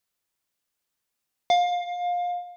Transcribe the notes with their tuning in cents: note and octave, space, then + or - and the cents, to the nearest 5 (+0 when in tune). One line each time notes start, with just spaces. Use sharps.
F5 +20